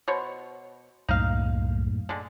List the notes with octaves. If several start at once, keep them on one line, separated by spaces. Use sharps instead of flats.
B2 C5 C#5
C2 F#2 A2 A#3 D#4 F5
D3 G#3